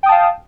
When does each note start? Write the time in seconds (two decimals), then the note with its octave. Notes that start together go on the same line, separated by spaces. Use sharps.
0.03 G5
0.06 D#6
0.09 A5
0.12 F5